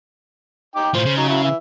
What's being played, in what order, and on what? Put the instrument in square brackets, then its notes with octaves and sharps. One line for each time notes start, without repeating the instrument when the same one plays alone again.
[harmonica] D#4 G5 D6
[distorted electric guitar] A2 F4 [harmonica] C5
[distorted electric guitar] C#3
[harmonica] F#3 D#4
F#3 E4
E3 E5